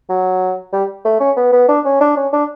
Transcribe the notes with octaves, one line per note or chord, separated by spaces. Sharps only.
F#3
G3
A3
C#4
B3
B3
D4
C#4
D4
C#4
D4